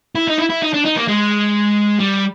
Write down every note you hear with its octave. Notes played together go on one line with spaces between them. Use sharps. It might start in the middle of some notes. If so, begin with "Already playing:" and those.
E4
D#4
E4
E4
D#4
D4
D#4
A#3
G#3
G3